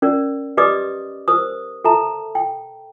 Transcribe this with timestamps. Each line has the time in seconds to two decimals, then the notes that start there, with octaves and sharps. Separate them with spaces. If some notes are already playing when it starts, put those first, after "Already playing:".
0.02 C#4 A#4 D5
0.57 G4 B4 D5 D#5 D6 D#6
1.28 A#4 C5 D#6
1.84 A4 E5 A5 A#5
2.35 G5